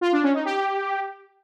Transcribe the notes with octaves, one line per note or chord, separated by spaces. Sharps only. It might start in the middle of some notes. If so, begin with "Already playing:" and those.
F4
D4
C#4
D#4
G4